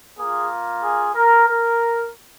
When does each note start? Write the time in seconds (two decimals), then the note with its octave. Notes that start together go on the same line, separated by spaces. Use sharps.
0.18 A#3 F4 G#4
0.83 G#4
1.15 A#4
1.48 A#4